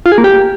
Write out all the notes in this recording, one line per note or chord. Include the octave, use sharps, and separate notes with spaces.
F4
G#4
A#3
G4